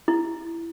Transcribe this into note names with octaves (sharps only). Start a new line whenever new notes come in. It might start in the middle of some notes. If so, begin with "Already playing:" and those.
E4